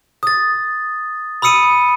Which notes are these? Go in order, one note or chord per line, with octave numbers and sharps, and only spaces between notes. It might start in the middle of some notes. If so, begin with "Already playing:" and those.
D#6 A6
B5 D#6 E6 C#7 D#7